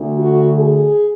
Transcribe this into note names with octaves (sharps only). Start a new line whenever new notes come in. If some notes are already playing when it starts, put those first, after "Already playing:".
Already playing: D2 D3
F#4
G#4